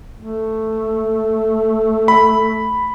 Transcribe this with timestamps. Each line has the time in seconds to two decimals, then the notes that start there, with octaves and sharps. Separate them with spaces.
0.18 A3
2.08 B5